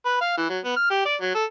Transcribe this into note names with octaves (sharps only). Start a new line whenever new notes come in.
B4
F5
E3
F#3
B3
F6
G4
D5
F#3
A4